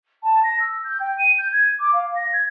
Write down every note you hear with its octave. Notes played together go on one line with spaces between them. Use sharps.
A5
A#6
E6
G6
G5
D#7
G6
G#6
D6
F5
A#6
G#6